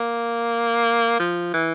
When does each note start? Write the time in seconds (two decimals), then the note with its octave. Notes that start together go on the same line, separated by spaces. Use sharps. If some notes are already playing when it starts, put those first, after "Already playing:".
Already playing: A#3
1.20 F3
1.54 E3